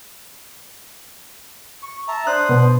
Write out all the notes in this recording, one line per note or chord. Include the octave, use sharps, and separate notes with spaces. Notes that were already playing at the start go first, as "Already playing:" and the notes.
C#6
E5 A5 A#5
D4 C5 D#6 F#6
B2